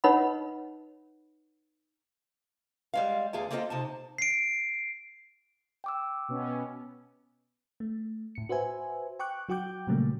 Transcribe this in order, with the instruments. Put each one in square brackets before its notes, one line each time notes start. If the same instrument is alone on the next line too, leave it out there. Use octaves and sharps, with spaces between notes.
[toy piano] D#4 B4 C#5 D#5 F#5 B5
[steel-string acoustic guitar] G3 G#3 F5
E2 D3 A3 D4 G#4 F5
A#3 C4 F4 A4 B4 D#5
C3 D#4 A5
[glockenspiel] C7 D7
[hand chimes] G5 D6 E6
[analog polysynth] B2 B3 C#4
[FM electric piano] A3
A2 C#7
F#4 B4 C5 E5 G#5
G5 C#6 D6 F#6
F#3 F#4 G5 D6 G6
A#2 C#3 F#3 G3 A3 A#3